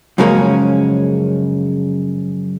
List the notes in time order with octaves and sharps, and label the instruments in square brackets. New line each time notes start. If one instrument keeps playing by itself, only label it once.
[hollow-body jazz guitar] F#2 C#3 F3 G#3 A#3 C#4